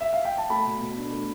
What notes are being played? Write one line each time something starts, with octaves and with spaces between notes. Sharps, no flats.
E5
F5
G5
A5
A3 B5
B2
B2
D4
A3